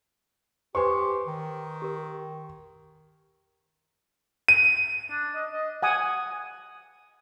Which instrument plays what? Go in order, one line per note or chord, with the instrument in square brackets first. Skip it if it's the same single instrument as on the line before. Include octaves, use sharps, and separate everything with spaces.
[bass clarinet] G4 [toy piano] B4 C5 [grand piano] G#5 C6 C#6
[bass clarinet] D#3
[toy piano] G4 A#4
[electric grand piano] D#7
[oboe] D4
D#5
D#5
[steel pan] F#5 G#5 D#6